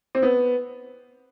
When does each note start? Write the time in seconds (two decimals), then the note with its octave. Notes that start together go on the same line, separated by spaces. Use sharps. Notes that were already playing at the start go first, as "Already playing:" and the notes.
0.15 C4
0.22 B3